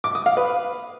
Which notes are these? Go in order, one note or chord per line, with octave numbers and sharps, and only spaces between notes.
D6
D#6
F5
B4